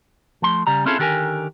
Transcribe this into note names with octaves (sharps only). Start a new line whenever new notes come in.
F3 A3 C6
C#3 G3 A#5
C4 C#4 E4 F4 G#4 A4
D3 D#3 F4 G4 A#4 G#5